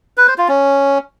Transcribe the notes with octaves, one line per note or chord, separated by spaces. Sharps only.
B4
C5
F4
C#4